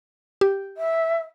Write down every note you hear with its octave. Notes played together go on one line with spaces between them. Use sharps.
G4
E5